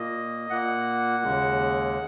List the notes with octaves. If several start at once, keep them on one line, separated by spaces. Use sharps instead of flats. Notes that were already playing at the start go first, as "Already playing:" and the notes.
Already playing: A#2 A#3 D#5
A#2 A#3 F#5
D#2 C#3 G#3